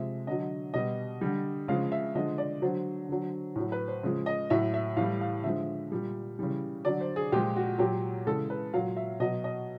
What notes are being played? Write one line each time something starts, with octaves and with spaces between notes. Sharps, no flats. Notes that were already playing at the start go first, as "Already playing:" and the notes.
Already playing: C3 F3 G#3 E5
D3 F#3 D#5
B2 G3 D#5
D3 G3
C#3 F3 G#3 F5
E5
D3 F3 G#3 D#5
D5
D3 F#3 C5
D3 F#3
A2 F#3
B4
C5
C#3 F3 G#3
D#5
A2 F#3 E5
E5
A2 E3 G3 F5
F5
D3 F3 G#3 E5
A#2 G3
C#3 E3 G3
D3 F#3 D5
C5
G#4
A#2 F3 G#3 G4
F#4
A#2 F#3 G4
C#3 E3 G#3 A4
B4
A#2 F#3 F5
E5
B2 F#3 D#5
D#5